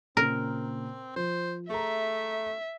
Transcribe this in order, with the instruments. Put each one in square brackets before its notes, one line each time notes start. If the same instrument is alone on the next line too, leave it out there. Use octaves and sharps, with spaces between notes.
[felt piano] A#2 C#3 [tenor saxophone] C4 [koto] A#4
[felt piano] F3 [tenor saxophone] C5
[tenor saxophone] A3 [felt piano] G#4 A#5 [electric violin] E5